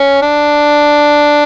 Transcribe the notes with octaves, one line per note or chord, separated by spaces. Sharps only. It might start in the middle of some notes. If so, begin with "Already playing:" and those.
Already playing: C#4
D4